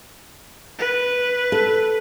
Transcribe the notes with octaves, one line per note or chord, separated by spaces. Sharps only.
B4
A4